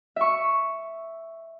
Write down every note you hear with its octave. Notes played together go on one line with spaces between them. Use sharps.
E5 C#6